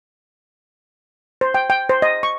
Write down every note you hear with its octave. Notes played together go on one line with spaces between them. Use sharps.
C5
G5
G5
C5
D#5
C#6